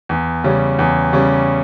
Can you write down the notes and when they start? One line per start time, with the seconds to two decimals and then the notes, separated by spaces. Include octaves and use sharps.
0.09 E2
0.44 C#3 G3 C#4
0.79 E2
1.13 C#3 G3 C#4